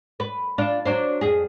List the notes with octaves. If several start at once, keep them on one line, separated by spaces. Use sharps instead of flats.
B4
D4 F4
F#3 D4 C5
F2 G#4